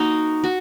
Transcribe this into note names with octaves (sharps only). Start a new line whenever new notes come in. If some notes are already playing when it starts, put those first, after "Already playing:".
Already playing: A#3 D#4 F#4
F#4